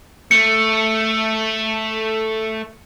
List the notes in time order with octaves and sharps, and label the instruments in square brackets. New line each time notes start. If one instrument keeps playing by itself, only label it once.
[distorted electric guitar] A3 [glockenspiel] C#7